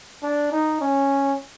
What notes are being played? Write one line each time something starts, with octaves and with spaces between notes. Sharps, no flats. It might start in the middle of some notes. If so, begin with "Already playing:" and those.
D4
D#4
C#4